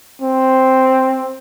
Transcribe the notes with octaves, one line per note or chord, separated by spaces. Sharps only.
C4